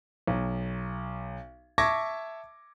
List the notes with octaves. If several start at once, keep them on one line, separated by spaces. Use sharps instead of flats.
B1
E5 A5 C#6 D6 G#6 A#6